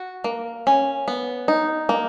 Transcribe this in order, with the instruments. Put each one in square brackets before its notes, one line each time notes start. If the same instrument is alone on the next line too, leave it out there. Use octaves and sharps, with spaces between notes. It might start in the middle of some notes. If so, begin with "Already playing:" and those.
Already playing: [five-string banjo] F#4
A#3
C#4
B3
D#4
A#3